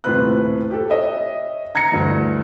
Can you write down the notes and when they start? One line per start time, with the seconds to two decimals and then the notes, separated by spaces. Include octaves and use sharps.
0.04 D#1 A2 C3 F4 B4 F#6
0.71 G4 A4
0.90 C#5 D#5 E5
1.75 A#5 G#6 A#6 C#7
1.92 D2 G2 E3